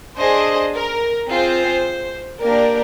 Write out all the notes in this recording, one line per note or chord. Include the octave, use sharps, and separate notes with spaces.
D4 G#4 C5 D#5
A#4
C4 F4 G#4 C5
A#3 D4 G4 A#4 D5